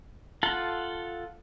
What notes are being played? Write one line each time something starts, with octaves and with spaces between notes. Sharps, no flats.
F4 A4 F#5 A5